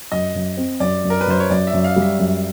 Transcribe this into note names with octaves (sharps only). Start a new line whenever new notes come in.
F#2 D#5
F#2
C4
F#2 D5
F#2
A#4
B4
F#2 C5
C#5
F#2 D5
E5
F#2
F5
G3
E5
F#2